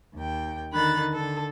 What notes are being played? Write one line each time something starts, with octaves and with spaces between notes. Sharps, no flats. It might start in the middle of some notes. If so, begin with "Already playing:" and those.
D#2 G5
D3 D#3 B5 F#6 A6
D3 A4